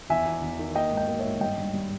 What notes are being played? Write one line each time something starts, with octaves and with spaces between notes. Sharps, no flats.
E2 E5 G#5
E2
E2
D#3
A#3 D#5 G5
G#2
D#5 G5
A#3
C#5 E5
G#2
G2 D#5 G5
G2
G3